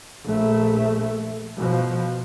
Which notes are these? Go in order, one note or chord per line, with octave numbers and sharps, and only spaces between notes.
A#1 A3
B2 F3